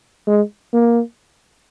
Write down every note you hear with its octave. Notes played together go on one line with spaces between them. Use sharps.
G#3
A#3